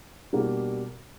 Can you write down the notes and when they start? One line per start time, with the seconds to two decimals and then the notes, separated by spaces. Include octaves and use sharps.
0.33 B2 G3 A#3 D4 G4